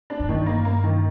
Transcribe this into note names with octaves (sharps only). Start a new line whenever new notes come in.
D4
G2
D#3
A#3
A#3
D#3